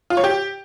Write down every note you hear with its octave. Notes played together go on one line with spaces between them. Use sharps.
F4
C#5
G4